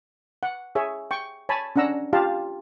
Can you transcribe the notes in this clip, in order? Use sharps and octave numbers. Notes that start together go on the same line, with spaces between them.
F#5
G#4 C#5 E5
G5 C#6
C#5 G#5 A5 B5
C#4 D4 F#5 A#5 E6
F4 G4 F5 A5